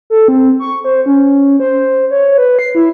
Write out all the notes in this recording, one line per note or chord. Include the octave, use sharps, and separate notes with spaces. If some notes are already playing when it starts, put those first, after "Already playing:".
A4
C4
C#6
C5
C#4
C5
C#5
B4
C7
E4